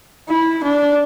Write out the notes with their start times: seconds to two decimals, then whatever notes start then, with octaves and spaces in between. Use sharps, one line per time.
0.28 E4
0.63 D4